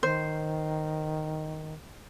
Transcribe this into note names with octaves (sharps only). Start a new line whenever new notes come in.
D#3 C5